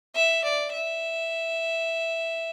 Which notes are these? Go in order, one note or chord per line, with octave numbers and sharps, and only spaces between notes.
E5
D5
E5